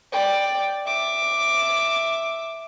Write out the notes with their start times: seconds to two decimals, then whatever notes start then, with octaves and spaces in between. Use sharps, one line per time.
0.12 D5 G5
0.86 E5 D6